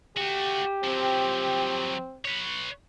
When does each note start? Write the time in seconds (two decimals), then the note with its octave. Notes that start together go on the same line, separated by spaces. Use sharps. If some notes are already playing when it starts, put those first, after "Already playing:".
0.17 A3 F#4 G4
0.84 F3 F#3 C4
2.25 B4 C#5